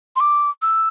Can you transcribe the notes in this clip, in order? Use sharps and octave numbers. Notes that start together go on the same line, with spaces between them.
C6
D6
E6